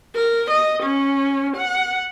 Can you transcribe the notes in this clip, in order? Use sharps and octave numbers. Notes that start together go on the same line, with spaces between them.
A#4
D#5
C#4
F#5